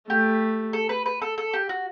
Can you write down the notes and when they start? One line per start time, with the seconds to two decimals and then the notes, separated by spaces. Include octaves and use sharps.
0.09 A3 G4
0.73 A4
0.89 B4
1.06 B4
1.22 A4
1.38 A4
1.53 G4
1.69 F#4